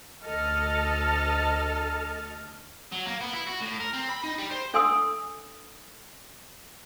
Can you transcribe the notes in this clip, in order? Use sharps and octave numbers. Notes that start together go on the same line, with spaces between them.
D2 A4 D#5 F6 A6
F#3
A#3
B3
E4
F#4
A2
A#4
C4
B5
D#4
G3
C5
D4 A4 G#5 C6 D#6 E6